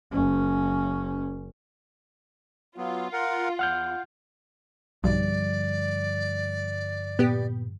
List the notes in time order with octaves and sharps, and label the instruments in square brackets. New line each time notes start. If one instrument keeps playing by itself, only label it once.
[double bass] F#1 C#4
[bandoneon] F#3 B3 [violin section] F4
[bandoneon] A#4 F#5
[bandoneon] E2 [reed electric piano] F#5 F6 G6
[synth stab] B1 [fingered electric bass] G2 D3 F3 [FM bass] G3 [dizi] D5
[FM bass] A#2 [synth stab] B3 G4